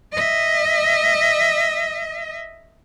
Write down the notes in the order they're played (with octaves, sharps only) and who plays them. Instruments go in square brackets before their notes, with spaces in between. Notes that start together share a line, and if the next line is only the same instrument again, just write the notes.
[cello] D#5 E5